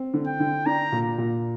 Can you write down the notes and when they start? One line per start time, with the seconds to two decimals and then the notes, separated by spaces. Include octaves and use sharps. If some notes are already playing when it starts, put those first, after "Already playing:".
Already playing: C4
0.14 D3
0.27 G5
0.40 D3
0.66 D4 A#5
0.92 A#2
1.18 A#2